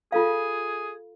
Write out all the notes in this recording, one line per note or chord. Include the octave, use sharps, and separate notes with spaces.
F4 G#4 A4 F5